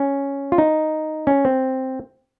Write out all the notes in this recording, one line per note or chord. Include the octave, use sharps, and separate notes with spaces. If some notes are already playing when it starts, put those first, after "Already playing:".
Already playing: C#4
F4
D#4
C#4
C4